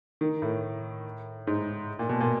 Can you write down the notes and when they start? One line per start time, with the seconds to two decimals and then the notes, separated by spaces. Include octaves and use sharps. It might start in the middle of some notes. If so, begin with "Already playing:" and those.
0.21 D#3
0.42 A2
1.47 G#2
1.99 A#2
2.09 B2
2.20 A#2